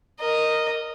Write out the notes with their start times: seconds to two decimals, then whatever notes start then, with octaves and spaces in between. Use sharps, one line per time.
0.20 A#4 D#5